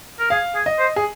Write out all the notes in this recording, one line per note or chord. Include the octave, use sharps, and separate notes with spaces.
A#4
G#4 F5
G#4
D#5
C5
G#4